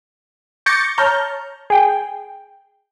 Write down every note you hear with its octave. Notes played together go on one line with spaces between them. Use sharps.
C#6 D6 G6 A6 A#6 C#7
C#5 A5 A#5 F6 G6
G#4 G5